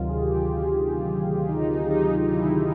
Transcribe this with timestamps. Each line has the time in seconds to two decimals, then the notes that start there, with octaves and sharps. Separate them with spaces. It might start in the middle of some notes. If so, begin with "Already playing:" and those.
Already playing: D2 C3 D#3 F#3 F4
0.09 G#4
0.21 G4
1.49 D#4
1.90 D#4
2.33 E4